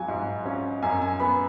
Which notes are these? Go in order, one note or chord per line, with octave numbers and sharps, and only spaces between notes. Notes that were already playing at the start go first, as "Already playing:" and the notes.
Already playing: G#1 F#3 G#5
G#2
C#4
F#2 G#5
G#5
B3 B5